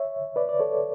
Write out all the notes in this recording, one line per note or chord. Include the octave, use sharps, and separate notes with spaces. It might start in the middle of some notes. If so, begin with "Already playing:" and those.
Already playing: C#5 E5
B4 D5
D5
A4 C#5